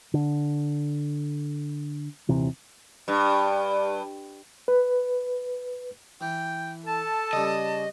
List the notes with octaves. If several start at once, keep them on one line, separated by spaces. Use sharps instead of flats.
D3
D#1 C3 E3
G2
B4
E3 G5
A4 A5
C#3 G3 C#4 D#5